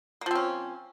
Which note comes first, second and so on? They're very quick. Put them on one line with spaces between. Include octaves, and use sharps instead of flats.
A#3 F3 C4 C#4